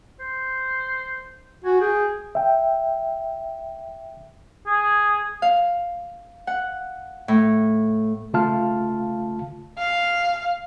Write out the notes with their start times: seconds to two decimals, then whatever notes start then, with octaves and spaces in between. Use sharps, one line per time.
0.20 C5
1.64 F#4 G#5
1.81 G#4 G5
2.35 E5 G5
4.66 G#4
5.42 F5
6.47 F#5
7.28 A2
8.34 C#3 A3 F4 F5 A5 F6
9.78 F5